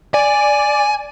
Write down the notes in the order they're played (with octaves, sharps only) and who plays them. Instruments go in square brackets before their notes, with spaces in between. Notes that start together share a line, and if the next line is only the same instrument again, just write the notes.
[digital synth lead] D5 [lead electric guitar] G#5